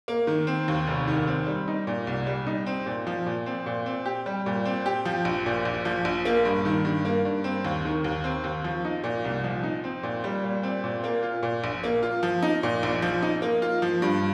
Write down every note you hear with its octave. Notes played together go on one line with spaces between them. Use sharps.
A#3
D#3
C4
D#2
F1
D#3
C4
G3
D#4
A#2
C2
G3
D#4
C4
A#2
F3
A#2
C4
A#2
C4
G4
G3
A#2
C4
G4
F3
A#1
A#2
A#1
F3
A#1
A#3
G2
D#3
G2
A#3
G2
C4
D#2
D#3
D#2
C4
D#2
F3
D#4
A#2
C2
F3
D#4
C4
A#2
G3
A#2
C4
A#2
A#3
F4
A#2
A#1
A#3
F4
F3
D#4
A#2
A#1
F3
D#4
A#3
F4
F3
G2